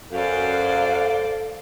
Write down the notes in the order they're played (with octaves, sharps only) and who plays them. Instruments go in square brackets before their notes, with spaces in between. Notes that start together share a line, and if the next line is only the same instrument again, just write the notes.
[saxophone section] F#2 [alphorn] A4 [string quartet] C5 D5 [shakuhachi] F5